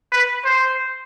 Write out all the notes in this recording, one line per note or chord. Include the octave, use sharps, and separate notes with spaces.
B4
C5